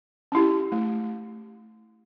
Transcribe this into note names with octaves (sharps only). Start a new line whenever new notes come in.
C#4 E4 G4
A3